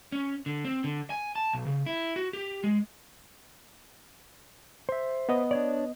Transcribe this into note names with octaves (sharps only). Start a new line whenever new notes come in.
C#4
D3
C4
D3
G#5
A5
B1
C#3
E4
F#4
G4
G#3
C5 E5
B3 D#5
D4 C#5 D5